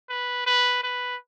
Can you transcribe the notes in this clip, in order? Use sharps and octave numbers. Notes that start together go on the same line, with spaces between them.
B4
B4
B4